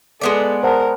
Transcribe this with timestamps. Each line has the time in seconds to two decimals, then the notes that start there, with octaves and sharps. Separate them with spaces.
0.21 G#3 B3 A4 D5
0.63 A#4 C5 F#5 A5